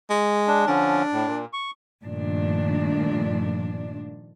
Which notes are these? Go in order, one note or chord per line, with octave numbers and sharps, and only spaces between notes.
G#3
D4
D3 F3 C#4 D4
A2
A#2
C#6
G2 A#2 D#3 F3 A3 D4